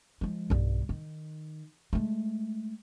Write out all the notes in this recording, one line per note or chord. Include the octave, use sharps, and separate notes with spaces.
F3 G#3
B1 G2
D#3
G#3 A3